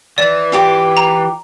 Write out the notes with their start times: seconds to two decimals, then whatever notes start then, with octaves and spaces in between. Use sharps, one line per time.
0.18 E3 D5
0.52 F4 G4 D6
0.97 A#5